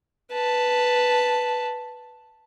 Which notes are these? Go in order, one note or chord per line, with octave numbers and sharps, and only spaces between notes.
B4 A5